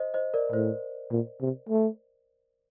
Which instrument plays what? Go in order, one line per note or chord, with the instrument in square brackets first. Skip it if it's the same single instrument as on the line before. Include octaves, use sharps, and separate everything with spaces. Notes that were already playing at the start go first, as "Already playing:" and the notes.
Already playing: [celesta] C5 D#5
C5 D#5
A#4 D5
[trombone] A2 [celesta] C5
[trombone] A#2
C3
A3